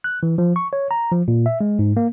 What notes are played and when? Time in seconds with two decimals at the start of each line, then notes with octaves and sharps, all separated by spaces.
0.04 F#6
0.23 E3
0.38 F3
0.56 C#6
0.73 C#5
0.91 A#5
1.12 F3
1.28 A#2
1.46 E5
1.61 G#3
1.79 G#2
1.97 A#3